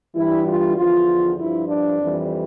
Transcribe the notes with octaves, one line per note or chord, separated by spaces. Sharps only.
G2 E3 G3 E4
F4
E2 D3 F3 F4
G2 F3 E4
D4
F2 E3 G3